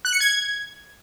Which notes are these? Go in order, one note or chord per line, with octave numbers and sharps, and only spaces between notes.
F#6
C#7
G#6